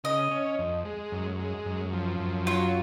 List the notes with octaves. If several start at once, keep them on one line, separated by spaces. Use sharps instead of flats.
C#3 D#5
C#4
F2
G#3
F#2
G#3
F#2
F3
F#2
F#3 F4